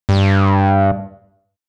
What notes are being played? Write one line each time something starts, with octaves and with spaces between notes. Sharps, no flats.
G2